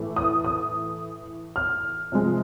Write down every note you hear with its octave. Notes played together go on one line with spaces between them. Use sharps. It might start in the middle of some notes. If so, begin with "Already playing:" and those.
Already playing: A2 E3 A3
D#6
D#6
F6
C3 F3 G#3